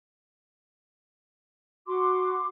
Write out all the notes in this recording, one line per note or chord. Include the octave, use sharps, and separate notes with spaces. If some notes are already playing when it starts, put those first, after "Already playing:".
F#4 C6 D6